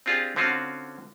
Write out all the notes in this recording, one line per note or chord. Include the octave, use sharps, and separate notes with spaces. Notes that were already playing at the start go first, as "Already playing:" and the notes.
C4 D4 F4 G4 G#4
D3 C4 C#4 F4 F#4